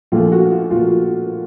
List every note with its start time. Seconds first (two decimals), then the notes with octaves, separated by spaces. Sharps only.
0.12 A#1 A#2 F3 A3 F4
0.32 F#4
0.52 F4
0.71 A#1 A#2 F3 A3 F4